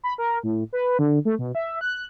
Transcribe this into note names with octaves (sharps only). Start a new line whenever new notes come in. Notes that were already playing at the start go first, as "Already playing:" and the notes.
B5
A#4
A2
B4
D3
A3
B2
E5
F#6